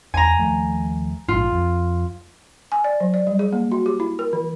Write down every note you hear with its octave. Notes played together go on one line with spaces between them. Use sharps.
E2 G#5 A#5
D#2 F3 A3
A#1 G#2 F4
F2
G#5
D5
F#3
D5
G3
G#4
A#3
F#4
G4
E4
A#4
E3